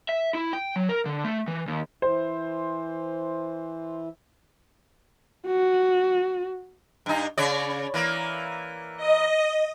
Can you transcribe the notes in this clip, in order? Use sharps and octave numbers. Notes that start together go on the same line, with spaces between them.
E5
E4
G5
F#3
A#4
D3
A3
E3
D#2
E3 C5
F#4
G2 D#4
C#3 C#5 D5
E3 A#3
D#5